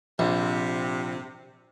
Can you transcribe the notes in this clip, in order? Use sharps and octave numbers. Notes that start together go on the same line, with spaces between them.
A#1 C3